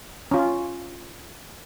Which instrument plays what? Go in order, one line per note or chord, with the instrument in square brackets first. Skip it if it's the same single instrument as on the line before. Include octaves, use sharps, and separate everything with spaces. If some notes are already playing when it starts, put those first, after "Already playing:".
[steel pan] C#4 F4